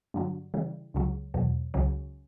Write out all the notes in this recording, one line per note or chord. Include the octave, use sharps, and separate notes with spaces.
G2 D3 F#3
C#3 E3 G3
C#2 C#3 F#3
E2 B2 F#3
C#2 C#3 F#3 C#4